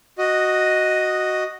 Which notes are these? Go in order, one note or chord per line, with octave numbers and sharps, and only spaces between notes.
F#4 D#5